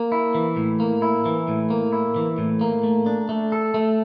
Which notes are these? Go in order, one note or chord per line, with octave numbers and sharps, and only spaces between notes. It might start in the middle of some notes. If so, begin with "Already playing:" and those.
Already playing: A#3
E4
E3
A2
A#3
E4
E3
A2
A#3
E4
E3
A2
A#3
A3
D4
A3
A4
A3